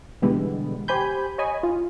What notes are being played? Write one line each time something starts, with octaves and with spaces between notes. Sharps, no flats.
B2 D3 E3 G3 G#3 B3
G4 C5 G#5 B5 G6
C#5 D#5 G#5 B5
F4